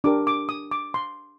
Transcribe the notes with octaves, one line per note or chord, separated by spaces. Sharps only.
D4 G4 A#4 D6
D6
D#6
D6
C6